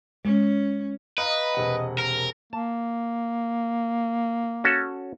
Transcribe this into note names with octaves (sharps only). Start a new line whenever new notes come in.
G#3 C#4
B4 D#5 F5 A#5
E1 C3 F#5
A#4
A#3 A5
C#4 F#4 A4